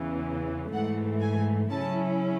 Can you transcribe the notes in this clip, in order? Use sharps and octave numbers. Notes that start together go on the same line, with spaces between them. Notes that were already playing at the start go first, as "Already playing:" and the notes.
Already playing: E2 C#3 E3
G#2 E3 A3 F#5
G#5
C#3 F#3 C#4 E4 A5